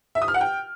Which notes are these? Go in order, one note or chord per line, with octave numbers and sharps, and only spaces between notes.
E5
D#6
F6
F#5
G5